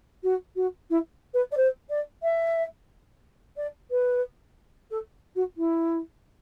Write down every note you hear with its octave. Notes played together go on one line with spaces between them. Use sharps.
F#4
F#4
E4
B4
D5
C5
D5
E5
D5
B4
A4
F#4
E4